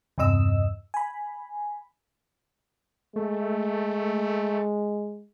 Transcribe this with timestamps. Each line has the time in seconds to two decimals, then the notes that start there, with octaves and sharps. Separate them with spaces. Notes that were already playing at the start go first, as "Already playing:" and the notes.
0.18 E2 G2 C3 D#5 E6
0.94 G#5 B5
3.16 G#3 A3